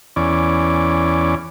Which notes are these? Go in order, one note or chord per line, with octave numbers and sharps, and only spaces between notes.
E2 C#4 D5